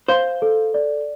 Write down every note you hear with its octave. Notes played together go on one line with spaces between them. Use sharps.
C5 F5
A4
D5